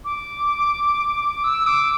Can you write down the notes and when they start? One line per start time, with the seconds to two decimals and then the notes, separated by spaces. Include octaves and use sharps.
0.05 D6
1.44 E6
1.67 D6